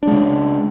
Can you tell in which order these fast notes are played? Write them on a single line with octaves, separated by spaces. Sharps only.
D4 G#3 C#3